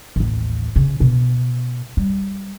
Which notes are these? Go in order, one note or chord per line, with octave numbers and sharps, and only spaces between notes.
A1 D#2
C#3
B2
G3